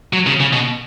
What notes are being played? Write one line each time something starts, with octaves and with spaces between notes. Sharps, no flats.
F#3
C#3
C#3
B2